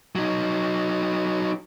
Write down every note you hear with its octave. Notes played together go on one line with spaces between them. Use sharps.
F#3 D#4